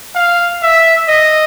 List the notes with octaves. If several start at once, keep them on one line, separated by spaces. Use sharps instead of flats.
F5
E5
D#5